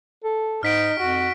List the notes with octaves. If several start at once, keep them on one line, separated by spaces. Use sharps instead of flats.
A4
G#2 D#4 F6 B6 D7
F2 F#4